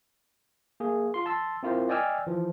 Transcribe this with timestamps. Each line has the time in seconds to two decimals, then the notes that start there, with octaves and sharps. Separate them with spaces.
0.80 A#3 G#4
1.14 F4 C6
1.26 A5 C6 E6
1.63 C4 E4 F4 A#4 C5
1.89 D5 D#5 G5 G#5 E6 F6
2.27 E3 F3